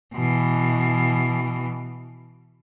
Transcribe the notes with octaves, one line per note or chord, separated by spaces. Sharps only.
B2 E3